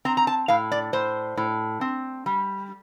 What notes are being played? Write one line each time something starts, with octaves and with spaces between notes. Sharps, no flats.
C4 A#5
A#5
A5
A2 F5
D5
A2 C5
A2
C4
G3